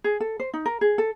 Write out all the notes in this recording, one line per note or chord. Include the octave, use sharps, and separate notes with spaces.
G#4
A4
C5
D#4
A#4
G#4
A4